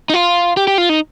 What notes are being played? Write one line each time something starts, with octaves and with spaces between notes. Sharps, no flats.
D#4
F4
G4
G4
F4
D#4